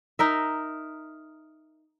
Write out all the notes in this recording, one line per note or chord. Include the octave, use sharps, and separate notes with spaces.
D#4 A#4 E5